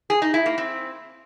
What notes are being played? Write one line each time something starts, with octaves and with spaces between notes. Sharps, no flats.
G#4
D#4
E4
A#3
C4